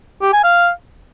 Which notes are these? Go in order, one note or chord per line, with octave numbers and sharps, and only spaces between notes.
G4
G#5
F5